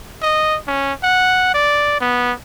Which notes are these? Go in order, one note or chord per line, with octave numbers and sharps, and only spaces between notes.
D#5
C#4
F#5
D5
B3